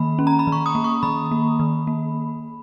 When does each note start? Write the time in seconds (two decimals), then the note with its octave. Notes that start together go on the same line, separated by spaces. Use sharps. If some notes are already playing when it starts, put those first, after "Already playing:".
Already playing: D#3 A#3 B5
0.19 C#4
0.27 A#5
0.39 B5
0.47 D#3
0.52 C#6
0.66 D#6
0.75 A#3
0.84 C#6
1.03 D#3 B5
1.31 A#3
1.59 D#3
1.87 A#3